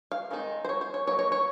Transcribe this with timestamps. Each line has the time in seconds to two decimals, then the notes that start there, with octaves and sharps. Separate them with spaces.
0.12 F5
0.31 D#3 G#3 C4 D#4
0.65 C5
0.69 C#5
0.81 C5
0.94 C#5
1.07 F#3 A#3 D#4 C#5
1.19 C#5
1.32 C#5